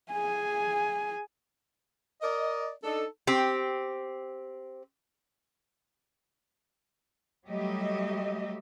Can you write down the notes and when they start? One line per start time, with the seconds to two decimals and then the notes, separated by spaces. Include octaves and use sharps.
0.11 G#4 G#5
2.22 A#4 D5 D#5
2.83 D4 D#4 A4
3.27 C4 G4
7.48 F#3 G3 A3 G4 D#5 E5